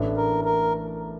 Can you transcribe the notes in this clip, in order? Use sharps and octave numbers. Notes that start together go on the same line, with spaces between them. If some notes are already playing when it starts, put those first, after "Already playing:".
Already playing: A1 A2 E3 A3 D4
A#4
A#4